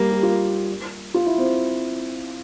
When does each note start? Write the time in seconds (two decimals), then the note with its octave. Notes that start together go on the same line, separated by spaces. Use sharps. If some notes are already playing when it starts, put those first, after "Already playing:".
Already playing: G3 A#3
0.12 G4
0.23 F4
1.14 F4
1.26 E4
1.38 C4